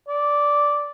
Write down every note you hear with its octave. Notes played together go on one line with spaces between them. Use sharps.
D5